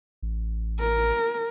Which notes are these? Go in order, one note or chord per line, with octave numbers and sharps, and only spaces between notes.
A1
A#4